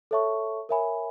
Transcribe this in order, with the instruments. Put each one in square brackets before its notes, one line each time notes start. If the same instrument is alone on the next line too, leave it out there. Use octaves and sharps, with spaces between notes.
[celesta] A4 C#5 E5 A5 C#6
A#4 C#5 E5 G#5 B5